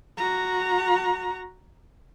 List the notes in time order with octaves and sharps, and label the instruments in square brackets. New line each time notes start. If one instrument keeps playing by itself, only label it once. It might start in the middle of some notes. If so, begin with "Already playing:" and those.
[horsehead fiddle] F#4 A#5